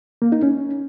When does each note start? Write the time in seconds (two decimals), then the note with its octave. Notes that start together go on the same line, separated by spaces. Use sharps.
0.22 A#3
0.32 D#4
0.43 C#4